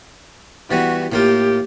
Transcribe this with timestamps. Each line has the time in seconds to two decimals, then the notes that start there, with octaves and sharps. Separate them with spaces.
0.71 E3 G3 B3 F#4
1.12 A2 A#3 F4 G4